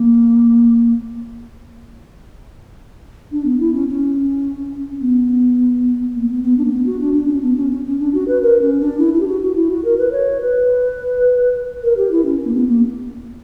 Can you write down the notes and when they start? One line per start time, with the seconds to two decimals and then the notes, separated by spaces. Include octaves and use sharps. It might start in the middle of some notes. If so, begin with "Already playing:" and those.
Already playing: A#3
3.32 D4
3.45 B3
3.60 E4
3.74 C#4
3.88 C#4
5.01 B3
6.16 A#3
6.29 B3
6.44 B3
6.58 D4
6.65 A#3
6.72 B3
6.86 F#4
7.01 D4
7.14 D4
7.28 C#4
7.43 B3
7.57 C#4
7.71 C#4
7.86 C#4
8.00 D4
8.14 F#4
8.28 B4
8.42 A#4
8.62 C#4
8.81 D4
8.99 E4
9.14 E4
9.20 G4
9.27 F#4
9.42 F#4
9.56 E4
9.71 F#4
9.85 A#4
9.98 B4
10.12 C#5
10.41 B4
11.83 A#4
11.97 G4
12.11 E4
12.25 C#4
12.40 C#4
12.47 A#3
12.54 B3
12.68 A#3